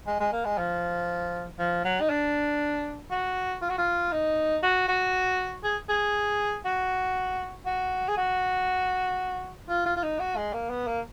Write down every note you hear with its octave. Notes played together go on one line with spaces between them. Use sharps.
G#3
G#3
A#3
G#3
F3
F3
F#3
D#4
D4
F#4
F4
F#4
F4
D#4
F#4
F#4
G#4
G#4
F#4
F#4
G#4
F#4
F4
F4
F4
D#4
F#4
G#3
A#3
B3
A#3